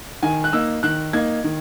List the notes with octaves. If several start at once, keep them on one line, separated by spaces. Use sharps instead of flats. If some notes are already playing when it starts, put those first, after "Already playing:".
D#3 G#5
F#6
A#3 D#4 E6
D#3 F#6
A#3 D#4 G#6
D#3